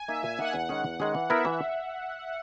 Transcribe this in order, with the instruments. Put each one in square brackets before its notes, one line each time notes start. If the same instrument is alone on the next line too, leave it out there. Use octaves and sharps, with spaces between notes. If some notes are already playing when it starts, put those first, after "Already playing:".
Already playing: [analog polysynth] G#5
[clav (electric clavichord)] A#3 D#4 [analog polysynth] E5
[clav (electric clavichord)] A#2 [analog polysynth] G#5
[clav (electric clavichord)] A#3 D#4 [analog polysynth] F#5
[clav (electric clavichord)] E2
D#3 G#3 C#4 G#4
E2
D#3 G#3 C#4 G#4
[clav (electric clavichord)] E3 [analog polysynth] F#5
[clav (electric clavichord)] B3 E4 A#4 [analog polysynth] E5
[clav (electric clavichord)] E3